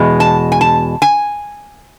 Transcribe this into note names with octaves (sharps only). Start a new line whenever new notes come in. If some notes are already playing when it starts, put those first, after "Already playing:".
Already playing: E2 B2 G#3
A5
G#5
A5
G#5